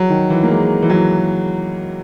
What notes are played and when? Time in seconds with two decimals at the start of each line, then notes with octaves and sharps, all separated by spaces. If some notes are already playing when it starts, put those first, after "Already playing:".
Already playing: F#3
0.10 D#3
0.30 E3
0.43 A#3
0.50 G#3
0.82 E3
0.90 F#3